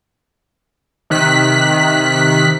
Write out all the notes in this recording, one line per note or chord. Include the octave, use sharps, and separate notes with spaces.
C3 D#3 F#6 B6